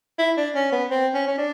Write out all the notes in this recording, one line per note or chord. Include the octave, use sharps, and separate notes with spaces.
E4
D4
C#4
B3
C4
C#4
C#4
D4